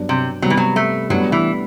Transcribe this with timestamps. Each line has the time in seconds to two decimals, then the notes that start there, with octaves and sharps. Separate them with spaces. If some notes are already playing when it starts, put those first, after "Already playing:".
Already playing: G2 F#3 B3 D4
0.09 C3
0.42 C3 F#3 G3 B3
0.50 E3
0.57 F#3
0.76 A3
1.10 A2 F#3 G3 B3 D4
1.32 E3